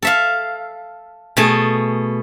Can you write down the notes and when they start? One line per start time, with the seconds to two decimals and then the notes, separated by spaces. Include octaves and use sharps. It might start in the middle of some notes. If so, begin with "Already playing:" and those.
0.02 A4 E5 F5
1.37 B2 A3 G#4 A5